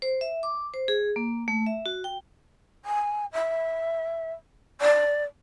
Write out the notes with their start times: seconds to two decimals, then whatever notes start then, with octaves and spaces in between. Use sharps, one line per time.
0.02 C5
0.21 E5
0.43 D6
0.74 C5
0.88 G#4
1.16 A#3
1.48 A3
1.67 E5
1.86 F#4
2.04 G5
2.85 G#5
3.32 E5
4.81 D5